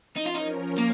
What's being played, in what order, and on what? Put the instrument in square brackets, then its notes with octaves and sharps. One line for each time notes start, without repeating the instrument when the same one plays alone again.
[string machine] F3 C#4 A#4 [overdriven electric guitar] D#4
[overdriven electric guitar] F4
D#4
A#3